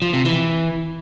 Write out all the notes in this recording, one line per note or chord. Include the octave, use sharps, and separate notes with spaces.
F3
C3
E3